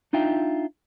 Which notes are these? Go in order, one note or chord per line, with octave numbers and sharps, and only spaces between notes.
D4 D#4 F4 E5 G5